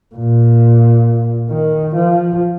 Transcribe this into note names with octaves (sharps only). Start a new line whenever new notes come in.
A#2
D#3
F3